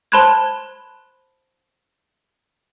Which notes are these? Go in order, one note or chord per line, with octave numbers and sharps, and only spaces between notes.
C5 A5 B5 C6 F#6 G#6